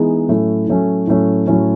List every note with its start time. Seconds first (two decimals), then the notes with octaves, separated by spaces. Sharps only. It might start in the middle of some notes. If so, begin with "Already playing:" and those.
Already playing: E3 G#3 B3 D#4 G#4
0.28 A2 F#3 A3 C#4
0.67 A2 F#3 A3 C#4
1.07 A2 F#3 A3 C#4
1.47 A2 F#3 A3 C#4